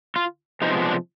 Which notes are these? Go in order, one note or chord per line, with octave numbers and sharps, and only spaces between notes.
F4
C3 F3 G#3 B3 D#4
D4